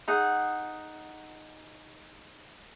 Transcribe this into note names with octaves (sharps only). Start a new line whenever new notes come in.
D#4 G#4 F#5